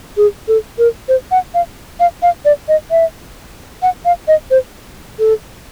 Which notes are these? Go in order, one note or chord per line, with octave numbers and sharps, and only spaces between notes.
G#4
A4
A#4
C5
F#5
F5
F5
F5
D5
D#5
E5
F#5
F5
D#5
C5
A4